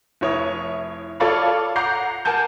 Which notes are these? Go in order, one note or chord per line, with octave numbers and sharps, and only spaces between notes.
F1 E4 C#5 D#6
F4 A4 C#5 D5 F5 B5
F#5 A#5 D6 G6 C7
A#4 F#5 G#5 A5 G6